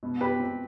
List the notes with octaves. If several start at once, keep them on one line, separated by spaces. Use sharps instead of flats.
B2
B2 G4 B4
C4